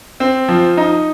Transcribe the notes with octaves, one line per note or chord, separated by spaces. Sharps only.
C4
F3
D#4